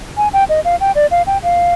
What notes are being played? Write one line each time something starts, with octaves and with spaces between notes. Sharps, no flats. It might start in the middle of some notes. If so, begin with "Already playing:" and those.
G#5
G5
D#5
F5
G5
D5
F5
G5
F5